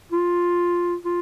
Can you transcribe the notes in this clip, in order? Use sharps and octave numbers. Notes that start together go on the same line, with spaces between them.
F4
F4